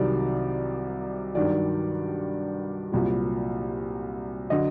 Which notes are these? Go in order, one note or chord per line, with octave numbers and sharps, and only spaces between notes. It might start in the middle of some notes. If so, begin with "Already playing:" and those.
Already playing: C2 C3 D#3 F#3 D5
G2 D#3 F#3 D5
C2 A#2 F#3
D3 F#3 D#5